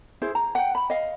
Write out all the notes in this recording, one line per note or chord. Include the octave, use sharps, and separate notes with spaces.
E4 G#4 C5
A#5
F#5 G5
B5
D#5 F5